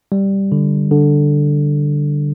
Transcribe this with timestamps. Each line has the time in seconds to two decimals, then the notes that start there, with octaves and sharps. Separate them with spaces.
0.12 G3
0.52 D3
0.91 D3